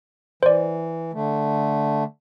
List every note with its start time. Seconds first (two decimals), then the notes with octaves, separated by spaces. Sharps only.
0.43 E3 C5 D5
1.13 D3 A3